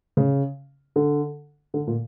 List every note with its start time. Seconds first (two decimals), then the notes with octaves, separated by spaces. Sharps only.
0.17 C#3
0.96 D3
1.74 D3
1.87 A#2